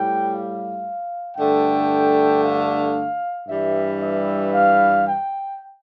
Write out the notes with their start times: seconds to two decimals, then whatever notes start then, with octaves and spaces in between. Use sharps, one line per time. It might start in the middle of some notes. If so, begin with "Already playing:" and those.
Already playing: A2 G3 G5
0.33 F5
1.37 G2 D3 A3 G5
2.44 F5
3.48 G2 E3 G3 E5
4.01 E5
4.54 F5
5.06 G5